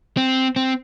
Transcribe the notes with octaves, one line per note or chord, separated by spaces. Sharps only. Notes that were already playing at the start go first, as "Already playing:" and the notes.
C4
C4